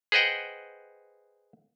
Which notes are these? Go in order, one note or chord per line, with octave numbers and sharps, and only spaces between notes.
G#4 B4 C5 D#5 F#5 G5